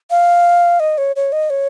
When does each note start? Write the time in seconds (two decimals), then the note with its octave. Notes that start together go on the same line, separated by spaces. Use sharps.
0.11 F5
0.80 D#5
0.98 C#5
1.16 C#5
1.32 D#5
1.50 C#5